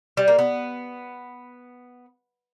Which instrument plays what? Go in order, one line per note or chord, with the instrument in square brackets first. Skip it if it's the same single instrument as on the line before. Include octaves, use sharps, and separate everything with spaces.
[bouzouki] G3
A#3
B3